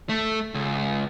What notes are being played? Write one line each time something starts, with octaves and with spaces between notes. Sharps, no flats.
A3
C#2